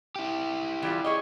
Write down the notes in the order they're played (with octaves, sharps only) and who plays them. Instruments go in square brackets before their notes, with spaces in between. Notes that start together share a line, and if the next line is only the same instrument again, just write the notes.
[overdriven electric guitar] E4 G4
[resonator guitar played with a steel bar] E3 G3 F4
G#4 C#5 D#5